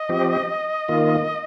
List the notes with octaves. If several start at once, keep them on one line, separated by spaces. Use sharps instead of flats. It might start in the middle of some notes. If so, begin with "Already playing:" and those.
Already playing: D#5
F3 C4 G4
D#3 A#3 F4